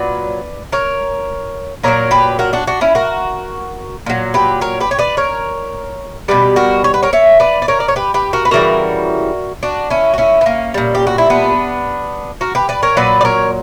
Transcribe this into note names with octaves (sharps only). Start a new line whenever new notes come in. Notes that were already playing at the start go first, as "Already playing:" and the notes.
Already playing: A#2 F#3 B4 D5
A#4 C#5
A#2 F#3 A#4 C#5
G4 B4
F#4 A#4
D4 F#4
D4 F#4
C#4 E4
F#4 A#4
A#2 F#3
G4 B4
A#4 C#5
G4 B4
C#5
B4 D5
A#4 C#5
B2 G3 G4 B4
F#4 A#4
C#5
B4
A#4 C#5
C#5 E5
B4 D5
D5
A#4 C#5
D5
C#5
G4 B4
G4 B4
F#4 A#4
B4
C#3 E3 G3 F#4 A#4
D4 F#4
C#4 E4
F#4
C#4 E4
B3
A#3 C#4
A#2 G3
G4
F#4
E4
B3 D4
F#4 A#4
G4 B4
B4 D5
A#4 C#5
A#2 F#3 B4 D5
D5
A#4 C#5